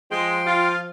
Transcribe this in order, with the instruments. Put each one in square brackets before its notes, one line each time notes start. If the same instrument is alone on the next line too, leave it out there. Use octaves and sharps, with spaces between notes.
[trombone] F3 [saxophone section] G#3 [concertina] G5 C6
[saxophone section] F4